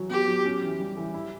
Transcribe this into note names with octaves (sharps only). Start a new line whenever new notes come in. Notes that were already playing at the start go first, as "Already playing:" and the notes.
Already playing: E3 F#3
B3 G4
F#3
C#4
E3
G3
E3
E4